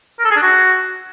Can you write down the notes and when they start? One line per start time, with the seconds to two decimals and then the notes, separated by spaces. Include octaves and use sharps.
0.19 A#4
0.25 A4
0.31 G#4
0.36 D4
0.42 F#4